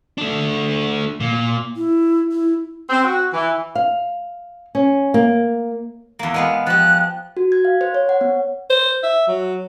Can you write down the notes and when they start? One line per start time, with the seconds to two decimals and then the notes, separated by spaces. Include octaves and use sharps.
0.18 A3 D4
1.20 A#2
1.76 E4
2.32 E4
2.88 C4
3.03 F#4
3.32 E3
3.75 F5
4.75 C#4
5.14 A#3
6.19 E2 A#3
6.34 G#3 B3 F5
6.67 F3 G4 F#6
7.37 F#4
7.52 G#6
7.65 F5
7.81 C5
7.95 C#5
8.09 F#5
8.21 B3
8.70 C5
9.03 E5
9.28 F#3